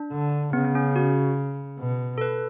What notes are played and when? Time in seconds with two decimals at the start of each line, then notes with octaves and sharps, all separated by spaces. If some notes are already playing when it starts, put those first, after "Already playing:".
Already playing: D4
0.12 D3
0.53 C#3 B3
0.65 B3
0.75 C#4
0.96 F#4
1.80 B2
2.18 A4
2.21 B4